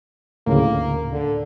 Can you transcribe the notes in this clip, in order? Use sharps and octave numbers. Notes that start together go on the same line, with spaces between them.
D2 A2 C#3 A#3
D3